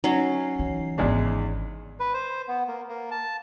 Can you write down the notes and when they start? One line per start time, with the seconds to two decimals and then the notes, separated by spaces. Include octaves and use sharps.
0.04 F#3 C#4 D#4 C#5 C7
0.59 E3
0.98 D1 G#1 E2 G#3 D4
2.00 B4
2.14 C5
2.48 B3
2.68 A#3
2.89 A#3
3.11 A5